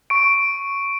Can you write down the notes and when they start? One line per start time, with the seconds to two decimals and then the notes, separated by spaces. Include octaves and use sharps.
0.10 C#6 D7